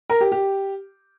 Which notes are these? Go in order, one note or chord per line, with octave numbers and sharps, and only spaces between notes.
A#4
G4
G4